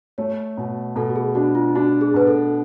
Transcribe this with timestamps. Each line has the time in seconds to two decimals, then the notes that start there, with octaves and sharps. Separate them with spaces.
0.18 A3 C#5
0.57 B2
0.96 B2 A4
1.10 F#4
1.16 G#4
1.35 D4 F#4
1.55 F4
1.75 D4 F#4
2.01 G#4
2.14 B2 B4
2.27 A4